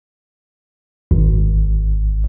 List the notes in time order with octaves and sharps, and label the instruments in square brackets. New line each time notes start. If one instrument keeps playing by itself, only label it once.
[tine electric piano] G#1